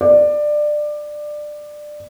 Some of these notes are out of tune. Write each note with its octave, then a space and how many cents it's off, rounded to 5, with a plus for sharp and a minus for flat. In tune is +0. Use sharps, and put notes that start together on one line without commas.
D5 +20